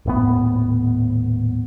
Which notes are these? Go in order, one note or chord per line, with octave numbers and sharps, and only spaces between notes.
D#1 A2 B3